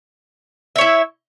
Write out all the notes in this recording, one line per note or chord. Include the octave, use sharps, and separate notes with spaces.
E4 C#5 E5